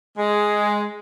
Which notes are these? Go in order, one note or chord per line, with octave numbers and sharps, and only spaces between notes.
G#3